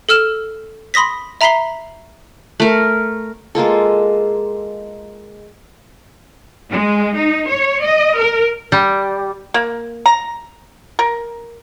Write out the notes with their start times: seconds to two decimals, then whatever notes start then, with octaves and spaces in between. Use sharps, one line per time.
0.09 A4 E6 F6 E7
0.94 B5 C6 D#6 A#6 B6
1.41 E5 A#5 B5 B6 C7 G7
2.60 A3 A#4
3.55 G#3 A#3 F4 A4
6.70 G#3
7.17 D#4
7.50 C#5
7.84 D#5
8.18 A#4
8.72 G3
9.54 A#3
10.06 A#5
10.99 A#4